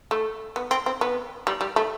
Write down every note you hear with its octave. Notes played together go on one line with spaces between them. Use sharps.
A3
B3
C4
C4
B3
G3
G3
A3